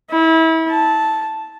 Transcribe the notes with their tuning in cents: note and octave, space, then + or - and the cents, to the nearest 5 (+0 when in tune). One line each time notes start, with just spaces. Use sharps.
E4 -30
A5 -5